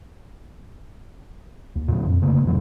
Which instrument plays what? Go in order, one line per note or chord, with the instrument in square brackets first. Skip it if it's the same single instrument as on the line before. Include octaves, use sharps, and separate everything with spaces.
[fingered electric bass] D#2
A#2 D3 F#3
F2
C#3 A3 A#3
F2 C#3 E3 F#3